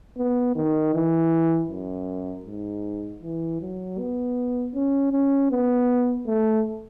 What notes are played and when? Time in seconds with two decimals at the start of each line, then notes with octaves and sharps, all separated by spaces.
0.18 B3
0.56 D#3
0.94 E3
1.69 F#2
2.45 G#2
3.22 E3
3.61 F#3
3.98 B3
4.74 C#4
5.13 C#4
5.51 B3
6.27 A3